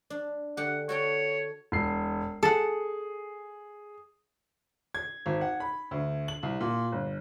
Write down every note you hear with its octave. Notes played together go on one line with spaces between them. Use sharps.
D4
D3 G4 F#5
F#4 A4 C#5 G5
E1 C7
G#4 A4 F#5
G#6
G#1
F#5
B5
D2
F#7
C2
A#2
G1